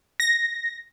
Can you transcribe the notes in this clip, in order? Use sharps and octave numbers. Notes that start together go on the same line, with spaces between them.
A#6